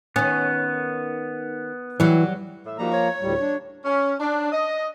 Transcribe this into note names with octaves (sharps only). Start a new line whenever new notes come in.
D#3 B3 C#4
E3 F#3 G3
A2 E5
F3 G3 A#3 D#4 F#4 A#5
C#5
D2 A2 G3
D4
C#4
D4
D#5